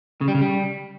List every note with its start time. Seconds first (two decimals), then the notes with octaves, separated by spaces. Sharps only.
0.21 C#3
0.28 G3
0.35 C#3
0.41 G3